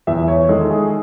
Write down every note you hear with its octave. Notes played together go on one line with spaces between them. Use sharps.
E2 E5
C#5
D#3 G#3 A4
G#4